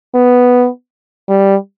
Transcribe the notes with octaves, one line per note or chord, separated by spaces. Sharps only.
B3
G3